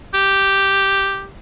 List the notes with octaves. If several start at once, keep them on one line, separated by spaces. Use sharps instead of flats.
G4